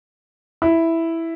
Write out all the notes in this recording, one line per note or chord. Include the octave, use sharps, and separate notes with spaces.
E4